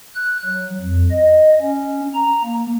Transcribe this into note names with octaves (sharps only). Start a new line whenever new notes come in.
F#6
F#3
F2
D#5
C#4
A#5
A#3